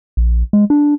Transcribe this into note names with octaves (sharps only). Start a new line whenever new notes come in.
A#1
G#3
D4